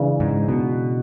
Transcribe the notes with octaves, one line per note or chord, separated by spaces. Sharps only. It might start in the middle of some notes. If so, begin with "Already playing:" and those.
Already playing: C#3 E3 G#3 D4
G#2
B2